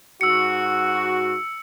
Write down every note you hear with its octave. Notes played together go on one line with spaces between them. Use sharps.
G#2 F#4 E6 C#7